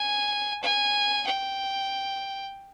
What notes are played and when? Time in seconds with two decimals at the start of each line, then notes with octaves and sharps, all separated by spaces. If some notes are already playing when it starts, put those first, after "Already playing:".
Already playing: G#5
0.62 G#5
1.27 G5